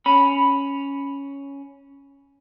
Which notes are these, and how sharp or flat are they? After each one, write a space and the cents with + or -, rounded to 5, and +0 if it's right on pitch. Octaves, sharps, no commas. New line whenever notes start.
C#4 +5 B5 +0